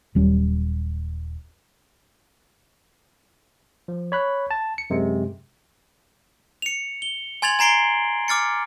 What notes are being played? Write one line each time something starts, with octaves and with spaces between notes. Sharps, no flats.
D#1 F#3 G3 C#4
F3
C#5 B5 F#6
A5
C#7
F#2 C3 G#3
C#7 F7
G7
G#5 C6 G#6 A6 F7 F#7
G#5 A#5 C7 D7 G7
D6 F6 A6 C#7